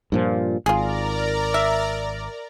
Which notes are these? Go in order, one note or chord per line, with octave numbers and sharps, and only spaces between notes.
G2 A#2 F3
G#1 F4 G#4 A#4 D5 A#5
E5